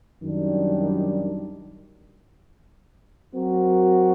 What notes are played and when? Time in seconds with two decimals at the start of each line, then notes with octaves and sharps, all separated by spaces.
0.22 F#2 D#3 G3 D4
3.34 F#3 C4 F#4 A#4